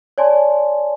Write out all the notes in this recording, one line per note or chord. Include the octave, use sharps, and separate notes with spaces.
C#5 D5 G#5 A5 C6